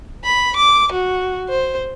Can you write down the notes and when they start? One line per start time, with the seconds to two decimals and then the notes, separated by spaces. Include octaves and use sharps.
0.25 B5
0.56 D6
0.92 F#4
1.49 C5